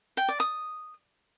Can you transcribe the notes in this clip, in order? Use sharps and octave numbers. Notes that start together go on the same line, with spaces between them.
G5
D5
D#6